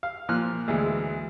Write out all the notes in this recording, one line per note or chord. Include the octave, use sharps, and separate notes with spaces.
F5
A#2 F3 F6 F#6
D2 E3 G#3